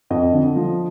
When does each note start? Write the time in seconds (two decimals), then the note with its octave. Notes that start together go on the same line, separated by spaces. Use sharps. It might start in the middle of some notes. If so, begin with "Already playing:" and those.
0.10 F2 D#5
0.33 D3
0.56 F3